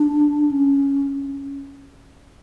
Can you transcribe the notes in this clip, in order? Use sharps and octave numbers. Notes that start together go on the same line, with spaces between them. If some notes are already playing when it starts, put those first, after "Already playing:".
Already playing: D4
C#4